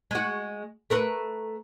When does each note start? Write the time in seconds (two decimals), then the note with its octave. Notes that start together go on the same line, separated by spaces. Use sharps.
0.11 G#3 F#4
0.90 A3 A#4 B4